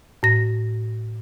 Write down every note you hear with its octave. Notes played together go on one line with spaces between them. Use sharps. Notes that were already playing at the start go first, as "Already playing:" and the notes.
A2 A#6